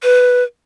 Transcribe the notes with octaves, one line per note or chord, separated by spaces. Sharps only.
B4